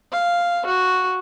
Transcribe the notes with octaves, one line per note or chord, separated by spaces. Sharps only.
F5
F#4